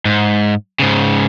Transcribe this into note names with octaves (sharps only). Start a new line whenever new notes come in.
G#2
G#2 C#3